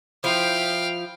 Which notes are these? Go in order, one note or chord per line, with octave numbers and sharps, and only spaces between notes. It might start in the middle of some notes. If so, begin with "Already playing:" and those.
F3 E4 F5 G5